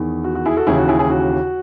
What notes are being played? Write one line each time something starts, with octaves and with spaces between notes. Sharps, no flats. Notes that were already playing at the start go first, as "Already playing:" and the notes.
Already playing: E2 D#3
F#4
F#4
E4 G#4
F#4 A4
D#2 C#3 E3 E4 G#4
F#4
E4 G#4
E4 G#4
F#4